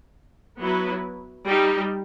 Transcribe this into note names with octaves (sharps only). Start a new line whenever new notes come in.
F#3 B3 E4 B4
G3 D#4 G4